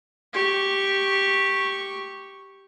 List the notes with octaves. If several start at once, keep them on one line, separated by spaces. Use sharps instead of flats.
G4 C#6